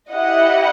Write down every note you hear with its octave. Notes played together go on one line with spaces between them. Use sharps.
E4 G4 D#5 F#5